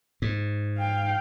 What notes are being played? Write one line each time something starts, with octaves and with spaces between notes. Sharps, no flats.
G#2
F5 G5